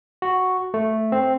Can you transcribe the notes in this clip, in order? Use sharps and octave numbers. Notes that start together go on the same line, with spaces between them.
F#4
A3
C4